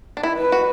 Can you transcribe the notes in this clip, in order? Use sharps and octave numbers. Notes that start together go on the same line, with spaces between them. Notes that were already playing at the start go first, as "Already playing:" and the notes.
D4
E4
B4
F#4